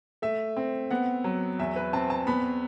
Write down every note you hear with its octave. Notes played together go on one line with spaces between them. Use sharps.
A3 E5
C4
B3 F#5
F#3
E2 E5
B4
C4 A5
A5
B3 B5